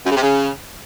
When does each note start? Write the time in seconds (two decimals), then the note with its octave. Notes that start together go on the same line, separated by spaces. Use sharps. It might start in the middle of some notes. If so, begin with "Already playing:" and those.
0.06 F#2
0.11 C#3
0.17 C3
0.22 C#3